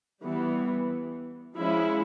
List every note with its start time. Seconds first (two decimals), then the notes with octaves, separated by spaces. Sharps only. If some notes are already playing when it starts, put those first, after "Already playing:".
0.24 E3 G3 B3
1.56 F3 G#3 C#4 E4